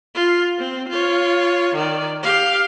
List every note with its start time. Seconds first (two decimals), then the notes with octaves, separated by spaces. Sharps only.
0.15 F4
0.59 C4
0.89 F4 C#5
1.75 D#3 D5
2.22 G4 F5